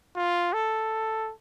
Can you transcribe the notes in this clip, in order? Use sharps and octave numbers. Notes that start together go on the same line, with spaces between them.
F4
A4